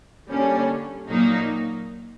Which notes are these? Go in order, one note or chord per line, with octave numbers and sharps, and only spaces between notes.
D3 G3 A#3 C#4
A#2 F#3 A#3 D#4